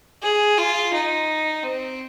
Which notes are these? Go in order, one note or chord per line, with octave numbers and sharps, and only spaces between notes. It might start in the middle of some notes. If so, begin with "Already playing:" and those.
G#4
F4
D#4
C4